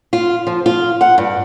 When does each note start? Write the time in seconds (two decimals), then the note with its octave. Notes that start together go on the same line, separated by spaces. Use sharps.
0.13 F4
0.47 F3
0.66 F4
1.01 F#5
1.18 G2